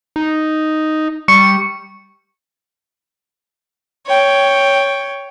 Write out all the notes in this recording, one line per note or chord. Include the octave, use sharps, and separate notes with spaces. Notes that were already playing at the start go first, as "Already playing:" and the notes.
D#4
G3 C#6 C#7
C#5 G5